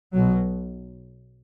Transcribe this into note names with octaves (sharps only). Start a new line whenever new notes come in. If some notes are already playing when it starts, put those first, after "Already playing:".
B1 B2 F#3